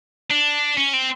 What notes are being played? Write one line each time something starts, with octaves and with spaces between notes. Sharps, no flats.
D4
C#4
C4